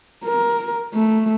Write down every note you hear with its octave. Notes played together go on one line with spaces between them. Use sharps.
A#4
A3